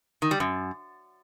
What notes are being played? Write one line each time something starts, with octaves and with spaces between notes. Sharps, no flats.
D#3
G3
F#2